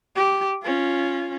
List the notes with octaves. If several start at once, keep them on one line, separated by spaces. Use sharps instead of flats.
G4
C#4 F4